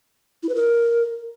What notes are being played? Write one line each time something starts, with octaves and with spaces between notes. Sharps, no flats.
E4
B4
A#4